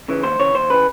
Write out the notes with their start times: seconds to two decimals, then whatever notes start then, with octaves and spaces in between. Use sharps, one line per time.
0.09 C#3 E3
0.23 D#2 C5
0.39 C#3 E3 C#5
0.55 D#2 C5
0.70 C#3 E3 B4